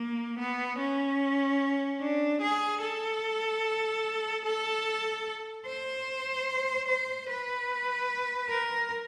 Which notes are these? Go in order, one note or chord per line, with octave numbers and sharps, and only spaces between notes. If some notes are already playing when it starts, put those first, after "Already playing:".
Already playing: A#3
B3
C#4
D4
G#4
A4
A4
C5
C5
B4
A#4